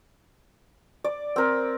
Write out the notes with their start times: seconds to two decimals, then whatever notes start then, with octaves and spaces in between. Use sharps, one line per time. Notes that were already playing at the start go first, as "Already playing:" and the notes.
1.04 D5
1.36 C4 A#4